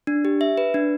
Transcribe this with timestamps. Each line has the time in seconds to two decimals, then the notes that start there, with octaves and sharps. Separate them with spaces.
0.07 D4
0.25 G4
0.41 E5
0.58 B4
0.74 D4